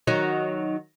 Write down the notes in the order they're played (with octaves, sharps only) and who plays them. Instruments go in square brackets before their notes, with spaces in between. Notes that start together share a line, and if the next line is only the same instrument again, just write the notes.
[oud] D#3 F#3 D#4